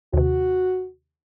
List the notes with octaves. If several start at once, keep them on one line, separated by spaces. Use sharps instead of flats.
D#2 C3 F#4